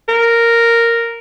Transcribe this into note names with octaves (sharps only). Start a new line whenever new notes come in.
A#4